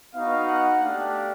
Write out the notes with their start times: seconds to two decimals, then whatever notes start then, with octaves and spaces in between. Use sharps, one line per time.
0.14 B3 D#4 F#4 F5
0.48 F#5
0.82 A3 D4 G4 F5